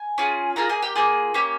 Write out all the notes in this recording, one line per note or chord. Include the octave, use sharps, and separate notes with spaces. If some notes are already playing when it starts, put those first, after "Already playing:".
Already playing: G#5
C#4 F4 G#4
A#3 F4 G#4 A#4 A#5
G#4 G#5
G4 G5
A#3 F4 G#4
A#3 C#4 G4